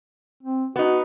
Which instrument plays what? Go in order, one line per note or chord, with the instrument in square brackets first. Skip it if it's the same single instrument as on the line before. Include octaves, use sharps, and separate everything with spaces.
[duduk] C4
[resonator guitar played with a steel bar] B3 D#4 [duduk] F#4